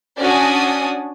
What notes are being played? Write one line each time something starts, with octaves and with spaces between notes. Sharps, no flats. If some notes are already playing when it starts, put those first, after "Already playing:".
C#4 D4 F#4 D5 G#5 D#6